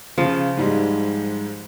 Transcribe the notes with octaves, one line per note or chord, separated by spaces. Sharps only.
C#3 F3
G#2 G3 G#3